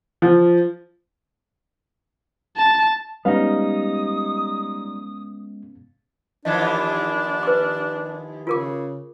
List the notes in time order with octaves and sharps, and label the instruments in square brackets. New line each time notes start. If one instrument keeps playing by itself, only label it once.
[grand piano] F3
[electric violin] A5
[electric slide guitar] G3 D#4 [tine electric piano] G#3 [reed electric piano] B3 C#4 F5 [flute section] D#6
[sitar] D#2 E3 F3 [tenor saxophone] D4 [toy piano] D#5
[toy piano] B4 D6
[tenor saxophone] C#3 [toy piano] F4 A#4 D6